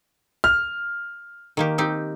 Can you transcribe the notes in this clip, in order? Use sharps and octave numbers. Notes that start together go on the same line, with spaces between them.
F6
D#3 A#3 G4
C4 D#4 G4